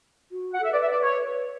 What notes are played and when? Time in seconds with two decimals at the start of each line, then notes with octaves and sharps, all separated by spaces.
0.32 F#4
0.53 F#5
0.60 A4 E5
0.72 B4 D5
0.82 E5
0.91 D5
1.03 C#5